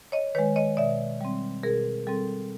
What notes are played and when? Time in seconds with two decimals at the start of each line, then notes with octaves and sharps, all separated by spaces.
0.12 C#5 D#5
0.35 D#3 G#3 B4 C#5
0.56 C#5 D#5
0.77 B2 D5 E5
1.21 G3 C4
1.63 B2 G#4 A#4
2.07 G3 C4 A4